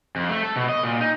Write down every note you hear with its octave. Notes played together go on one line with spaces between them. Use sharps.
F2
A3
A4
B2
D#5
A#2
D#4